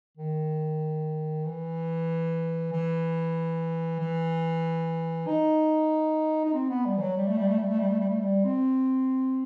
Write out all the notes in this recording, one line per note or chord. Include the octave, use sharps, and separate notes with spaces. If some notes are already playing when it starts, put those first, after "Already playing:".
D#3
E3
E3
E3
D#4
D#4
C4
B3
G3
E3
F#3
G3
A3
G3
A3
G3
A3
G3
A3
G3
A3
G3
C4